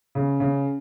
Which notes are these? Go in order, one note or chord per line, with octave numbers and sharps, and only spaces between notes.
C#3
C#3